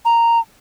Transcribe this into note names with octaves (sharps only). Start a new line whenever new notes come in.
A#5